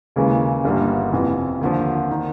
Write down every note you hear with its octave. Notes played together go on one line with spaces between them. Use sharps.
D#2 C#3 E3 G#3
G1 G2 D3 G3 A#3
F2 C3 E3
D#2 D3 F3
D#3